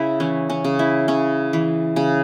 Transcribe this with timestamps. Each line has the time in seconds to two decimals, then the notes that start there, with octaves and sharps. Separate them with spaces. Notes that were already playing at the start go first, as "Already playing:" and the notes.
Already playing: C#3 E4
0.20 E3 C#4
0.50 C#4
0.64 C#3
0.79 E4
1.08 C#3 C#4
1.53 E3
1.96 C#3